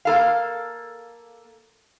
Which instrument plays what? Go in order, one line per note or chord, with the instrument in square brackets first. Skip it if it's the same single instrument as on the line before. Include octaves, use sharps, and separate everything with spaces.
[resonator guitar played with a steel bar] A#3 A4 F5